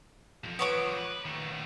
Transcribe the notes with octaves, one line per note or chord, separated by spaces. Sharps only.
B1 F2
F3 F#3 B3 C#5 D6
B4
D#3 A3